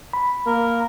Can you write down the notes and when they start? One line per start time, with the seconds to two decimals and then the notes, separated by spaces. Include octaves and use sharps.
0.13 B5
0.46 A#3 A#4